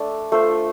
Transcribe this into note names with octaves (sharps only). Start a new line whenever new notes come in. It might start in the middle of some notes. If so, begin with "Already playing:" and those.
Already playing: A3 D4 A4
A3 F4 C5